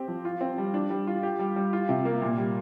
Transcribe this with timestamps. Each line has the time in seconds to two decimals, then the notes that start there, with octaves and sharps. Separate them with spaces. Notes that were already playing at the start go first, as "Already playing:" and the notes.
Already playing: C4 G4
0.08 F3
0.25 F4
0.41 C4
0.58 G3
0.74 D4
0.90 G3
1.07 F4
1.23 G4
1.39 G3
1.56 G3
1.73 F4
1.89 C3
2.05 A#3
2.22 A#2
2.38 G3